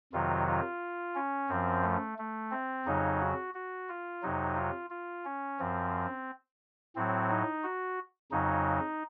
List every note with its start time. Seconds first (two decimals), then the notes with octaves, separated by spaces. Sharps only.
0.12 F2 C3 D#3 F#3 F4
0.48 F4
1.15 C#4
1.49 F#2 F3 C4
1.84 A3
2.18 A3
2.51 C4
2.85 F2 C#3 F#3 D#4
3.20 F#4
3.54 F#4
3.89 F4
4.22 F2 C3 F#3 D#4
4.56 F4
4.90 F4
5.25 C#4
5.59 F#2 F3 C4
6.96 A2 F#3 C4
7.30 D#4
7.64 F#4
8.31 F2 C#3 F#3 D#4